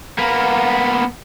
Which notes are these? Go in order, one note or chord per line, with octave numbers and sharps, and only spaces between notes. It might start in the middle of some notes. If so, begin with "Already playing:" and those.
A#3 B3